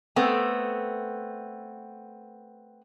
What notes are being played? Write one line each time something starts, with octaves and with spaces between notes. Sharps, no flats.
A3 B3 C4